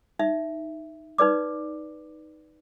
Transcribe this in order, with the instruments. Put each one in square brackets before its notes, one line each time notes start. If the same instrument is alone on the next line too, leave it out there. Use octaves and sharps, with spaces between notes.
[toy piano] D#4 E5
D#4 B4 D5 D6